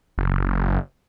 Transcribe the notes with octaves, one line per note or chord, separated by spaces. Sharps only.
F#1